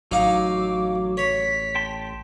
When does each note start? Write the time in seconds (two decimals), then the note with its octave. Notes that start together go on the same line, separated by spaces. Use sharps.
0.12 A1 F#3 D#4 F5 D6
1.17 C#5 B6
1.75 G5 A5 C6